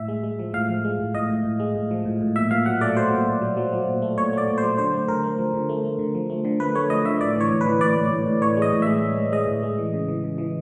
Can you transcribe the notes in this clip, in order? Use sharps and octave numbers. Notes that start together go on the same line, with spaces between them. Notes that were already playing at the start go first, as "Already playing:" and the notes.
Already playing: A2 E5
G#3
G#3
F3
A2 F5
F3
G#3
A2
A2 D#5
A2
A2
G#3
A2
F3
A2
A2
A#2 E5
A#2 F5
F#3 F#5
A3 D5
F#3 C5
A#2
A#2
F#3
F#3
F#3
A#2
A3
A#2 C#5
A3 D5
A#2
C5
F#3
D3 C5
A3
D3 A#4
A3
F3
D3
A3
A3
D3
F3
A3
D3
A3 B4
A3 C#5
F3 D#5
D3 E5
A2 D5
E3
C#5
A2
B4
E3
A2 D5
A2
A2
A2
E3 C#5
G#3
D#5
A2
G#3 E5
G#3
G#3
G#3 D#5
A2
G#3
E3
C#3
E3
C#3
E3